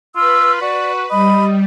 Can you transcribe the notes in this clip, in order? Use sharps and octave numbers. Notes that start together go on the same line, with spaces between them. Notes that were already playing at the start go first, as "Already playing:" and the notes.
F4 B4 E6
F#4 D5
G3 D#5 B5